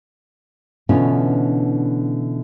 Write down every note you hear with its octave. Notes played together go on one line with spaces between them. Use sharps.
B2 D3 E3 C#4 D4 F4